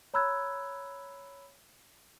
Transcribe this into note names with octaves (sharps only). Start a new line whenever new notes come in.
C#5 A#5 B5 E6 F#6 G#6